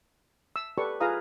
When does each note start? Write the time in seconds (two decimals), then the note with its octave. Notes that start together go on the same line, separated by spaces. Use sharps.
0.56 E6
0.78 G4 A4 B4 D5 C#6
1.00 F4 G#4 B4 F5 A#5 D#6